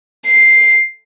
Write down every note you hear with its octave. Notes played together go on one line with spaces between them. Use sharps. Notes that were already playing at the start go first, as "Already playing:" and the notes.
C7